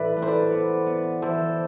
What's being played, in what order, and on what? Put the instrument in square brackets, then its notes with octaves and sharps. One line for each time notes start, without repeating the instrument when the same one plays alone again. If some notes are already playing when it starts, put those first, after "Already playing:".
Already playing: [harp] A2 E3 [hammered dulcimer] B4 D5 E5
[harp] A3
[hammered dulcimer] C5
B4 D5
[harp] B3
B3
[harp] E3 [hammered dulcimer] A4 C5